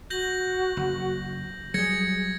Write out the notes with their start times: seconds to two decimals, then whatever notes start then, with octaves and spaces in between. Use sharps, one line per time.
0.10 F#4 G6 A#6 F#7
0.77 F#1
1.74 F#3 G3 G#4 G#6 A#6 C#7